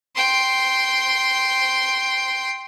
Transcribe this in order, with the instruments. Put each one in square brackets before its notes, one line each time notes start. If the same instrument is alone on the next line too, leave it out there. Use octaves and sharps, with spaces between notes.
[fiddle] G5 C6